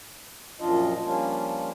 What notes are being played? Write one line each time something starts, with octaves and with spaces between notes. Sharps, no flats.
F#2 A#2 F3 D4 F4 D#5
F3 G3 A#3 C#4 D4 F4